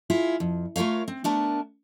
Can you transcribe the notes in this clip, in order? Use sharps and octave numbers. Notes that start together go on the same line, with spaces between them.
E4 F4 G#4
F2
A3 F4 A#4 C#5 F5
C4
A3 B3 D4 A#4 A5